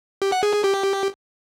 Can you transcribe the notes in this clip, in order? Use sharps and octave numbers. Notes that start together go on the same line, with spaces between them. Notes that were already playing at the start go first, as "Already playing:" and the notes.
G4
F#5
G#4
G#4
G4